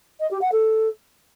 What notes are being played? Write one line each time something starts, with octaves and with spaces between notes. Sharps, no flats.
D#5
G4
F#5
A4